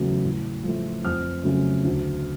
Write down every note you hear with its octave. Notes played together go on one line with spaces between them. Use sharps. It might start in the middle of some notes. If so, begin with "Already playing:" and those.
Already playing: E2 C#3 F#3 A3
A2
F3 A3
F2 F6
C#3 F#3 A3
D2